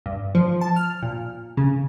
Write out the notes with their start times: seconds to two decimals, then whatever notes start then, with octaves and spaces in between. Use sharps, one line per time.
0.06 G2
0.35 F3
0.61 A5
0.76 F6
1.02 A#2
1.57 C#3